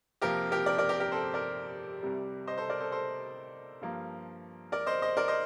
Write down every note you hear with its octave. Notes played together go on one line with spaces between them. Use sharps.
F2 C3 F3 A#3 G4 A#4
G4 A#4
A#4 D5
A#4 D5
G4 A#4
G4 A#4
A4 C5
A#4 D5
C2 C3 G3
C5 D#5
A4 C5
A#4 D5
A4 C5
A4 C5
G2 F3 A#3
A#4 D5
C5 D#5
C5 D#5
A#4 D5
C5 D#5